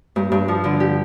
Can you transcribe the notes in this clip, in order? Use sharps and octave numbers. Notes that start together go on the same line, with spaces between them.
G2
G2
F3
D3
G4